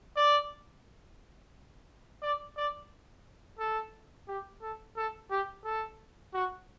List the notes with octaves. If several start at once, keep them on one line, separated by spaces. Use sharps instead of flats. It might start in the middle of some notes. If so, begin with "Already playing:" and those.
D5
D5
D5
A4
G4
A4
A4
G4
A4
F#4